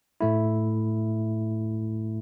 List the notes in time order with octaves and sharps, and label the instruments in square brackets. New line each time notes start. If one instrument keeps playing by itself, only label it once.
[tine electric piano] A2 A3 E4